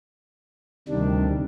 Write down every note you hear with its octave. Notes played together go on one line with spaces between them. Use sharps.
D2 C3 D#3 G3 D4